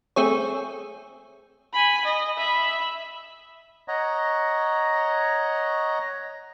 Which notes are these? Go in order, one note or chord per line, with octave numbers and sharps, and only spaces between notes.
A3 C4 G#4 C#5
G#5 B5
D#5
E5 B5
C#5 D#5 F#5 A#5